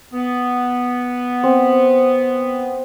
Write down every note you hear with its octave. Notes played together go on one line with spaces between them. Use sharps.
B3
C4